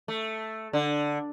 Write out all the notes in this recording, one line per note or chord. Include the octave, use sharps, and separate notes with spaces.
A3
D3